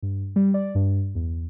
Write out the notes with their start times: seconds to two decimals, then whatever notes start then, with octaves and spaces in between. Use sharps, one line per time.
0.03 G2
0.36 G3
0.54 D5
0.75 G2
1.15 E2